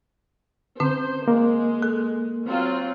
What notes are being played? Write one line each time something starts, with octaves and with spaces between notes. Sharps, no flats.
D3 C4 C#4 C5
G#3 A#3
A4
F#3 C4 F4